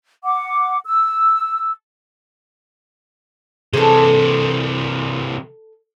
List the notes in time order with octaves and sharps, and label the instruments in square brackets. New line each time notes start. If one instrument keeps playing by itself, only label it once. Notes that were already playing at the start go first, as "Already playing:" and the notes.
[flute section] F#5 D6
E6
[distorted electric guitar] C3 E3 [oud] G#4 A4